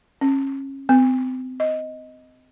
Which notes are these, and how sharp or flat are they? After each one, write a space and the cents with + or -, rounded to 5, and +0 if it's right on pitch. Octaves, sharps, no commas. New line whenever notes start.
C#4 -25
C4 -35
D#5 +10